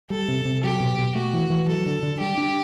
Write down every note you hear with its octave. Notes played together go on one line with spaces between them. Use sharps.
G3 A4
C3
C3
F#3 G4
B2
B2
A3 F#4
E3
E3
F#3 A4
D3
D3
G3 G4
D4